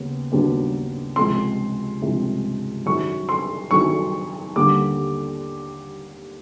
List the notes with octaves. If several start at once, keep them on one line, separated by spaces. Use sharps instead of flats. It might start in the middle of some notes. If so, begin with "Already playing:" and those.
Already playing: D#2 C#3 B3
D#2 C#3 F#3 B3 D4
C#2 C3 F3 G#3 C6
C#2 C3 F3 G#3
F#2 D#3 F#3 C#6
C6
F#2 D#3 F#3 C#6
D#2 D3 G3 D6